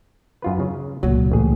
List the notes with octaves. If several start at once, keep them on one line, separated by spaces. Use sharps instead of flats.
F#2 F4 B4
C#3
C#2 A#2 F#3
A1 G#4